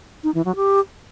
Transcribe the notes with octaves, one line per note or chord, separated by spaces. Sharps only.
D#4
E3
F#3
G4